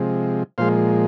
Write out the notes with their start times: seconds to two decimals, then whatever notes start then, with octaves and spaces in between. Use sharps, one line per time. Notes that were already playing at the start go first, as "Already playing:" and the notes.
Already playing: C3 F3 G#3
0.58 A#2 F3 G#3 C5 F5